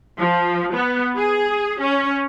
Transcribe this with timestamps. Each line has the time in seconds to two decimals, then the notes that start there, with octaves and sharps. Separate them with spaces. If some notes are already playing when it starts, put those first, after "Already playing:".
0.20 F3
0.74 B3
1.17 G#4
1.81 C#4